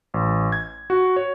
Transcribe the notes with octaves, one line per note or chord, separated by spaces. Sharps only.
A1
G#6
F#4
C#5